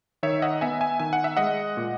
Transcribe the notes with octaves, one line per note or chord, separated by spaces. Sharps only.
D#3 C#5 E5
D#5 F#5
B3 E5 G#5
E5 G#5
D#3 G#5
F#5
E5
G#3 D#5 F#5
A#2